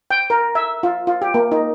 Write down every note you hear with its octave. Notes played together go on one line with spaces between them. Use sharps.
G5
A#4
E5
F4
F4
G4
A#3
D#4